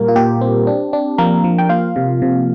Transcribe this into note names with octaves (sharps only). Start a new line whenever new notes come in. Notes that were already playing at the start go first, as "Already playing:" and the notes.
Already playing: A#2 G3 A#3 A#4
F4
A#2 G4
C4
D4
D4
F3 A#3 A#4
F3
G5
A#3 F4 F5
C3
C3